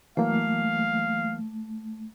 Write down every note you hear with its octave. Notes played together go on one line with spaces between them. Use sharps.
E3 F#3 A3 A#3 F5